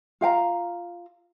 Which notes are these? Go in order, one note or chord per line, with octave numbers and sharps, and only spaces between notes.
F4 F5 G5 A#5